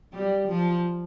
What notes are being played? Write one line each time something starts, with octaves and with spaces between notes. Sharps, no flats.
G3
F3